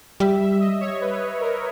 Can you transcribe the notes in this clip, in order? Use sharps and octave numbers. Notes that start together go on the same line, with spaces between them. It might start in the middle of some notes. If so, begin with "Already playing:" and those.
G3 E5
E5
D#5
C#5
B4
A#4